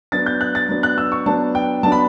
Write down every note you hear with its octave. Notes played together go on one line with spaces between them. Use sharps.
F#3 B3 D4 A6
G6
F#6
A6
F#3 B3 D4
F#6
E6
C#6
F#3 B3 D4 A5
G5
F#3 B3 D4 A5
B5